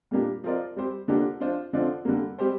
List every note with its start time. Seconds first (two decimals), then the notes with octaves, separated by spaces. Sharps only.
0.11 A#2 G3 A#3 D4 G4
0.44 F3 C4 F4 A#4 D5
0.76 G3 C4 G4 C5
1.08 D3 F3 A#3 D4 G4
1.40 F3 D4 F4 C5
1.73 D3 F3 C4 F4 D5
2.05 D3 G3 A#3
2.38 G3 C4 G4 C5